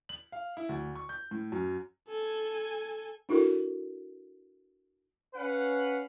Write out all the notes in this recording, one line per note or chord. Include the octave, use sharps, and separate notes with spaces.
F#7
F5
E4
D2
C#6
G6
A2
F#2
A4 G#5
D4 E4 F#4 A4 A#4
C#4 B4 F5 F#5